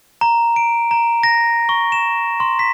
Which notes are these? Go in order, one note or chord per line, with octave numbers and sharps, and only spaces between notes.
A#5
D7
A#5
A#6
C#6
E7
C6
B6